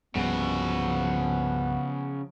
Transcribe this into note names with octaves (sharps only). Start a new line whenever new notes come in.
C2 G2 C#3 F3 G3 B3 F#4